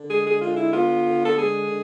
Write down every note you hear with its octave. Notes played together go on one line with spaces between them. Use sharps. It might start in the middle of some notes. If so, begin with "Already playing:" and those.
Already playing: D3
G#3 G#4
G#4
D3 F4
E4
B3 F4
D3
A4
G#3 G#4
D3